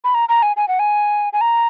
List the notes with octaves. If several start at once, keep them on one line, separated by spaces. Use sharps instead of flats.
B5
A#5
A#5
G#5
G#5
F#5
G#5
G#5
A#5